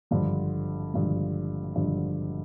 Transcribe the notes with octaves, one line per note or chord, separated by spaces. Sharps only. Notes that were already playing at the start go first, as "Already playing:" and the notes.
G#1 G2 D3 F3
G#1 G2 D3 F3
G#1 G2 D3 F3